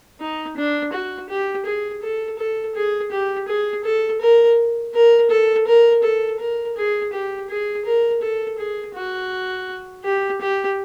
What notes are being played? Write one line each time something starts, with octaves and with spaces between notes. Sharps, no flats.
D#4
D4
F#4
G4
G#4
A4
A4
G#4
G4
G#4
A4
A#4
A#4
A4
A#4
A4
A#4
G#4
G4
G#4
A#4
A4
G#4
F#4
G4
G4